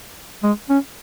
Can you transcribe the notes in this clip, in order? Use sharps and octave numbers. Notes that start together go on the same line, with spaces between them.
G#3
C#4